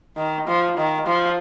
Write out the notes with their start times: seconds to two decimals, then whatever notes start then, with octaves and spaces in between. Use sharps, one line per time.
0.17 D#3
0.48 F3
0.77 D#3
1.07 F3